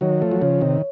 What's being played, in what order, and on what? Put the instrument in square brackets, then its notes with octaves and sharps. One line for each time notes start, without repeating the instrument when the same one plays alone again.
[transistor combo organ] D#3 F#3 [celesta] C#5
[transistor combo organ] F3 A3
F#3
[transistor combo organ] C#3 F3 [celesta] C#5
[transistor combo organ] C3 D#3